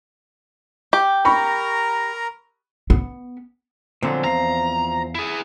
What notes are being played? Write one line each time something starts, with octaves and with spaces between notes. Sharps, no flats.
G4
A#4 A#5 B5 C#6
B3
A#2 D3 F3 F#3 C4
E2 F5 A#5
E4 G#4